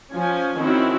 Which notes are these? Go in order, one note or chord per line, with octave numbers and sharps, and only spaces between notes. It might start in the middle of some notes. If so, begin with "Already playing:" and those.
F3 C#4 G#5
D#3 C4 C#4 E4 F#4